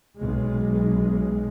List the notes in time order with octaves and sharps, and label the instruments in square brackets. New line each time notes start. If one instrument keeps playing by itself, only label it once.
[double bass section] B1 G#3